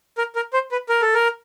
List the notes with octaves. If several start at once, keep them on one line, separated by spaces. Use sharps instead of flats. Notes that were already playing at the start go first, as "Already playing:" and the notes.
A#4
A#4
C5
B4
A#4
A4
A#4